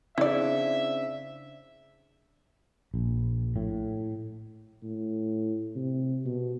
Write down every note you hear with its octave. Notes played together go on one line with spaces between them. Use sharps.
C#3 C4 D4 E4 D5 E5
A#1
A2
A2
C3
B2